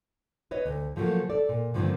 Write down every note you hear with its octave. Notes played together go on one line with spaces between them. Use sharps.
B4 C#5 D#5
D2
C#3 F3 F#3 A3 A#3
A4 D5
A#2
G2 D3 D#3 F3 A#3 C4